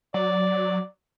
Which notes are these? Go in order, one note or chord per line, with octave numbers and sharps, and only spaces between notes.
F#3 D5